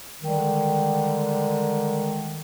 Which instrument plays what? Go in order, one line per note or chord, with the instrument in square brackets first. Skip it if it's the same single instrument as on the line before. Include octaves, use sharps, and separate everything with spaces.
[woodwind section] D3 D#3 G3 G#3